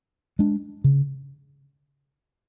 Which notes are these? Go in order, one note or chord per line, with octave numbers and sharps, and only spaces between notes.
G#3 D4
C#3